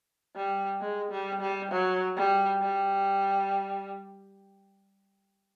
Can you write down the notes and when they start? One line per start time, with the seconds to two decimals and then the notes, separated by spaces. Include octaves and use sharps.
0.36 G3
0.81 G#3
1.11 G3
1.41 G3
1.71 F#3
2.16 G3
2.62 G3